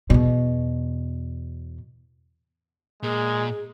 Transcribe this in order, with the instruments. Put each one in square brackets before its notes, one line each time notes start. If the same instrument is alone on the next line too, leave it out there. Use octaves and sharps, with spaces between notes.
[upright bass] E2 B2
[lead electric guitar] A#2 [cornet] G#3 [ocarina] G#4